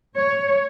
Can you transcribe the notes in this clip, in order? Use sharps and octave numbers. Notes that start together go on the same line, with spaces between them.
C#5